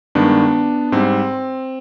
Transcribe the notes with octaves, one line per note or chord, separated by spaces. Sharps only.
G2 D#3 G#3 B3 D4
G#2 G3 C4